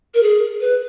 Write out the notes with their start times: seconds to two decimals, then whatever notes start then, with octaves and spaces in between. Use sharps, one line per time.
0.14 A#4
0.23 G#4
0.61 B4